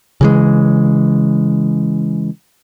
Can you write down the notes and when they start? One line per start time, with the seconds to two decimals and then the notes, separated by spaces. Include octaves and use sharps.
0.21 C#3 E3 G#3